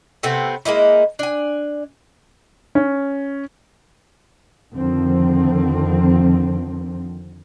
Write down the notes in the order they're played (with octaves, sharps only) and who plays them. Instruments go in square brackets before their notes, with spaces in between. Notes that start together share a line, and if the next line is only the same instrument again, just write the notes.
[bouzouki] C3 A3 B3 C4
G#3 A#3 D#4 E4
D4 G#5
[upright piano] C#4
[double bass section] F2 D3 D#3 F3 C4